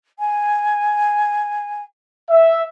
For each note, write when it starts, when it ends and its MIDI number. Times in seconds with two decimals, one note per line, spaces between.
0.19 1.82 80
2.30 2.63 76